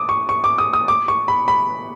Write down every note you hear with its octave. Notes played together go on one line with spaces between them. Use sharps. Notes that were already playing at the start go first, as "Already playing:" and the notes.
Already playing: D6 D#6
C#6
C#6
D6
D#6
D#6
D6
C#6
B5
B5